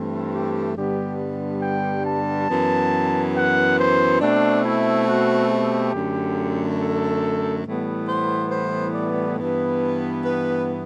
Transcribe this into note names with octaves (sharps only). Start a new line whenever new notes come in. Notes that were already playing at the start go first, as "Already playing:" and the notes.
Already playing: G2 E3 A3 C4
G4
G2 D3 G3 B3 G4
G5
A5
F#2 E3 B3
F#5
C5
B2 A3 C4 D4
E4
F#4
G4
F#2 D3 A3
A4
A2 E3 G3 B3
C5
C5
D5
G2 E3 B3
B4